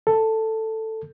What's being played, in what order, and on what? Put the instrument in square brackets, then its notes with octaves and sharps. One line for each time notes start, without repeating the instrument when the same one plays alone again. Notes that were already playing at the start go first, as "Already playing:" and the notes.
[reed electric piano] A4